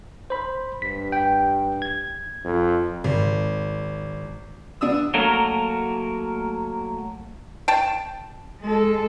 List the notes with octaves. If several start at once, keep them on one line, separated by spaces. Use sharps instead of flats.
C5 B5
G2 B6
G5
G#6
F2
G#1
B3 D4 D#6 E6
F#3 A3 A#3 F#4 A#4
G5 A5
G#3 A4